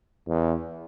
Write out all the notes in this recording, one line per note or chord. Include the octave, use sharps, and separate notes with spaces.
E2